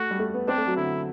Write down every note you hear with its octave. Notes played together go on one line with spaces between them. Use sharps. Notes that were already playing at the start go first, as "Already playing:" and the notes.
Already playing: A3 F#4
G3
A3
B3
C4 D4
A3
F#3
D3 E4